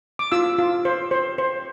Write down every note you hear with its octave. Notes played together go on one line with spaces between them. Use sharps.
D6
F4 E6
F4
C5
C5
C5